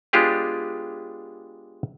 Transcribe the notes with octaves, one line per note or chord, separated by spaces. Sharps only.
G#3 B3 D4 F4 G4 G#4